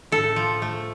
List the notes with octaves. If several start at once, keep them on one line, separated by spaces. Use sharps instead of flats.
A2 A4
F3
A3